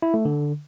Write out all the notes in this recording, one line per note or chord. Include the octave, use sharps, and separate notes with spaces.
E4
A3
D3